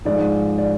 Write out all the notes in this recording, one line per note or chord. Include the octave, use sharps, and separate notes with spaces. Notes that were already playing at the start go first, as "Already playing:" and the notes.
G#2 F3 G#3 D5
D5